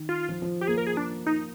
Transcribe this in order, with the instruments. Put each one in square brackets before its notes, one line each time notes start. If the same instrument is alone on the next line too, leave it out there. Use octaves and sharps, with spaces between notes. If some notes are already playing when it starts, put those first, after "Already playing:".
Already playing: [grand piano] D#3
[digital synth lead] F4
[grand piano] F3
F3
[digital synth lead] G4
[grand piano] A#3 [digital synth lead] G#4
[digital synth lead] A#4
G#4
D4
D#4